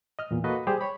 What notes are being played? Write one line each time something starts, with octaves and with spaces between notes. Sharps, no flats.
D#5 F6
E2 A#2
A#3 F#4 A4 B4 D#5
G3 G4 G#4 C5
C#5 B5